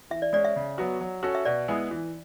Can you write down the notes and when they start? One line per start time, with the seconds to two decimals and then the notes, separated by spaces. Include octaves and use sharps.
0.11 E3 E5
0.22 D5
0.33 G#3 C#4 D5
0.45 E5
0.56 C#3
0.78 F#3 B3 F#4
1.01 F#3
1.23 C#4 F#4 A4
1.35 E5
1.45 B2 D5
1.68 G#3 B3 E4 G#4
1.91 E3